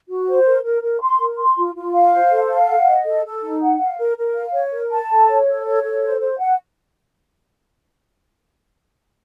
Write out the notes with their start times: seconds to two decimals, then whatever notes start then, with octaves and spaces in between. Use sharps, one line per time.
0.08 F#4
0.27 C5
0.45 A#4
0.64 A#4
0.82 A#4
1.01 C6
1.19 A#4
1.38 C6
1.57 F4
1.75 F4
1.94 F5
2.12 C5
2.30 A4
2.50 F5
2.68 F#5
2.86 D#5
3.05 A4
3.24 A4
3.42 D#4
3.61 F#5
3.80 F5
3.99 A#4
4.17 A#4
4.35 F5
4.54 C#5
4.72 A#4
4.92 A5
5.09 A4
5.28 C#5
5.47 A4
5.66 C#5
5.83 A4
6.03 C5
6.20 C5
6.39 F#5